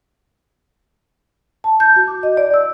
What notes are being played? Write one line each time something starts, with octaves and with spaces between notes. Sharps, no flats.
A5
G6
F#4
D6
D#5
D5
E6